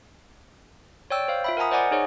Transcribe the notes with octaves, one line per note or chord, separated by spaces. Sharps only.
C#5 D5 G5 E6
C5 F5
F4 E5 B5
A#4 F#5 G#5 A#5 D#6
C5 D5 D#5 F#5 G#5 D6
D#4 G#4 C#5 D#5